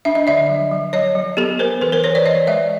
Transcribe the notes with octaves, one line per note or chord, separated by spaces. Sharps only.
D4 E5
D#5
D3 D5 E5
F#3
F#3
F#3 C#5 D#5
F#3
B3 G4 A4
B3 A#4 C5
E3 A4 B4
A#4 C5
E3 B4 C#5
C5 D5
E3 C#5 D#5
G#3 D5 E5